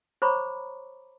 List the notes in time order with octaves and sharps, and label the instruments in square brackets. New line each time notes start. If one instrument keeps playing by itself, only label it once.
[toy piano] C5 C#5 A#5 B5 C#6 D6